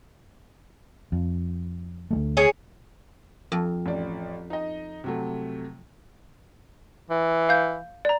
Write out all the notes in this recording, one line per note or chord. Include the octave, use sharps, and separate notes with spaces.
F2
D2 G#3 A3
G#4 C#5
F2
A1 D5
D#4 D#5
C3 F#3 A3
E3
F5 G6
D5 A#5